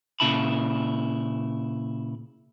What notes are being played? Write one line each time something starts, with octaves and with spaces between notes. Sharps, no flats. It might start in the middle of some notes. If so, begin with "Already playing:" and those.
A#2 C#3 E4 A5 B5